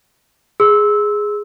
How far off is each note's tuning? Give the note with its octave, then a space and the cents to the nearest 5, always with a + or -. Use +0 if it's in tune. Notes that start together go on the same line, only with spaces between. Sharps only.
G#4 +0 C6 +0 E6 -15